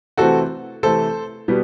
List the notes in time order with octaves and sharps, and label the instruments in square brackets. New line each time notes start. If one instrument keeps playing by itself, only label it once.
[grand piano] C3 E3 A3 C4 F#4 A4
C3 E3 A3 C4 A4 C5
B2 G3 B3